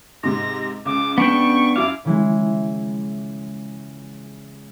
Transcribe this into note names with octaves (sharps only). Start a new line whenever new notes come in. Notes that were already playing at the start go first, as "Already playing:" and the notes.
G#2 C3 A#6
C#2 D6
B3 D4 G5 C#6
F#2 E4 F5 D6
C#3 E3 G#3